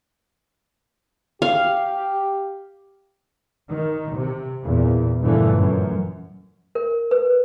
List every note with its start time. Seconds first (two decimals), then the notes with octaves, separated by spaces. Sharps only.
1.42 G4 F5
3.69 D#3
4.15 C3
4.64 E2 A#2
5.21 G2 A#2 D3 E3 F3 A3
5.55 F#2
6.75 A#4
7.11 B4